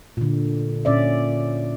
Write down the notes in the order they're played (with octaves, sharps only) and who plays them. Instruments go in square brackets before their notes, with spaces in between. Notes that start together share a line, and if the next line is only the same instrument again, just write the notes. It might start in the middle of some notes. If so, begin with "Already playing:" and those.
[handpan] A#2 D3
A#2 C#4 D5 E5